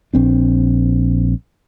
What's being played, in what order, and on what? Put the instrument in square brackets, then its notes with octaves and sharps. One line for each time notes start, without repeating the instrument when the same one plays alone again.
[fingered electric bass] A#1 C4 D4